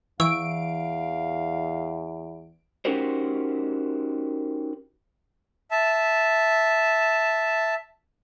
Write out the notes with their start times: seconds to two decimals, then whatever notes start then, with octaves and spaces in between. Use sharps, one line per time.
0.20 E2 E3 F5 C#6 E6 D7
2.85 C#4 D#4 F#4 G4 A#4 C5
5.71 E5 A5